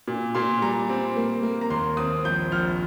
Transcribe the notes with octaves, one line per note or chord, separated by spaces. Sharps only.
A#2
A#2 C6
G3 A#5
C4
A#3
A#3
A#5
D#2 C6
C4 D#6
A#1 G6
A#1 F6